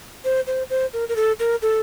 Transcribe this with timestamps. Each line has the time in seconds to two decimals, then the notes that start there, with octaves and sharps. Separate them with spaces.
0.24 C5
0.47 C5
0.70 C5
0.93 A#4
1.09 A#4
1.16 A4
1.39 A#4
1.62 A4